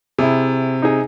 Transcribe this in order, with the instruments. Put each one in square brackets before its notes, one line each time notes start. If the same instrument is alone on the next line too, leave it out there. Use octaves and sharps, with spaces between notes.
[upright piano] C3 [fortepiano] E4 G#4
[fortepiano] D#4 G#4